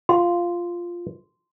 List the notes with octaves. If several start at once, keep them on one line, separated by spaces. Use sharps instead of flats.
F4 C6